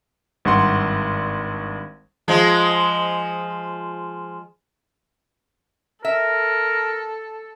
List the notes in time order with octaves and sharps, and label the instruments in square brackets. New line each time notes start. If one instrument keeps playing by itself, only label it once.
[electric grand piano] G#1 G2 F#5 C6
[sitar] F3 G#3
[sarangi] A4 [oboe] A#4 [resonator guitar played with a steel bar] E5